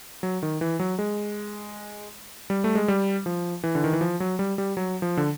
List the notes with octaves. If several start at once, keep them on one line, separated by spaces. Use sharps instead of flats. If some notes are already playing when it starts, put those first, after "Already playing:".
F#3
D#3
E3
F#3
G#3
G3
A3
G#3
G3
F3
E3
D3
D#3
E3
F3
F#3
G3
G3
F#3
F3
D3